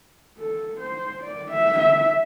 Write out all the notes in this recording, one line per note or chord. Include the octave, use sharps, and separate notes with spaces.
A4
C5
D5
E5
E5